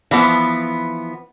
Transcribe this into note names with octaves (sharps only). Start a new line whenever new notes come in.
E3 F3 B3